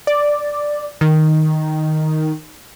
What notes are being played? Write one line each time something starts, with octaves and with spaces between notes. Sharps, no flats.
D5
D#3